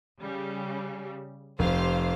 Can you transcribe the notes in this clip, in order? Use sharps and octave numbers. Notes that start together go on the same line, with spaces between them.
C#3 G3
F1 G4 C5 F5